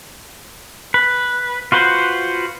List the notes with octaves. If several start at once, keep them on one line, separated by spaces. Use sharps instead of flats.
B4
F4 F#4 B4 C5